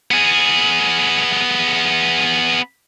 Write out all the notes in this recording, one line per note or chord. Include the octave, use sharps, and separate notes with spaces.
B3 G#4